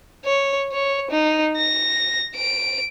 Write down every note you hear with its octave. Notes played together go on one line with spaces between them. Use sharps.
C#5
C#5
D#4
A#6
D7